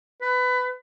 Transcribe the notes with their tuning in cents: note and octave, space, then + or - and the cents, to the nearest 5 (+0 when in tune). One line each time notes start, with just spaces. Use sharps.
B4 +20